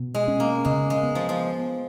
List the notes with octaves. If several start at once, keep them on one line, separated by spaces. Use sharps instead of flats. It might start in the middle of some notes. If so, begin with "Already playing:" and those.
Already playing: B2
G#3
C#4
A#3
C#3 G#3
G#3
B3
F3
F3